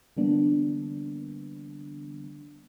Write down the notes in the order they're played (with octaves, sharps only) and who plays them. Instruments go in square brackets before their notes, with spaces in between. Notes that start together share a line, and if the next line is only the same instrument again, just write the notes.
[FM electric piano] D3 E3 G3 A#3 B3 D4